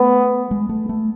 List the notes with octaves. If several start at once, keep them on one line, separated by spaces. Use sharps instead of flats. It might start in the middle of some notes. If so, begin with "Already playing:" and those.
Already playing: A3 B3
G#3
A3
A3